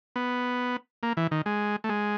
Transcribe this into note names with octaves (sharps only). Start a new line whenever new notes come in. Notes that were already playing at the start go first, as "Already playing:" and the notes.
B3
A#3
E3
D#3
G#3
A3
G#3